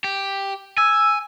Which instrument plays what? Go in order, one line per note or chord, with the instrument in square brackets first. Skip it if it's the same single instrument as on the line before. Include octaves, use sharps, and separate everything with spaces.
[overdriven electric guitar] G4
[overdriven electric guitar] G#5 [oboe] E6